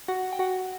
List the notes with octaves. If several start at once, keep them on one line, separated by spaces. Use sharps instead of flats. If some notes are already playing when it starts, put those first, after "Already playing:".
F#4 F#5
G5
F#4 F#5